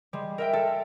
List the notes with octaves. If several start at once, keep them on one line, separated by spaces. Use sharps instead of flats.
G3 G#3
A#4 E5 G5
A4